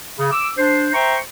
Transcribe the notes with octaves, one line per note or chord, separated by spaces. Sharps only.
C#3
D6 E6
D4 C5
C5 E5 G5 A#5 C6 C#6